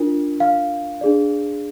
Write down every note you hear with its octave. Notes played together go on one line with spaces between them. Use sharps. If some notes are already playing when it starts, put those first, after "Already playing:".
Already playing: D4 F4 A#4
F5
D4 G#4 D5